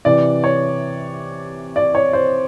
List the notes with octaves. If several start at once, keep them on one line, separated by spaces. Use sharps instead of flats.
C3 E3 D5
C#5
D5
C#5
C5